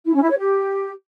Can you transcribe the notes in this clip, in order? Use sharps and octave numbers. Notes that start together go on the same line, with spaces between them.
E4
C#4
E4
C#5
G4